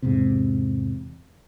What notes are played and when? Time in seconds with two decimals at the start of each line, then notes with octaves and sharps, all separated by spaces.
0.02 E2 G#2 C3